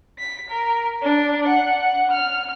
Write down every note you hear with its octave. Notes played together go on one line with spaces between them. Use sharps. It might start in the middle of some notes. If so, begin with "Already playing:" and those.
B6
A#4
D4
F#5
F6